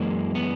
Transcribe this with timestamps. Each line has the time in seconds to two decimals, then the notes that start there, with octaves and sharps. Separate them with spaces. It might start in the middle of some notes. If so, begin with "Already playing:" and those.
Already playing: F#2 E3 G#3 A#3
0.35 B3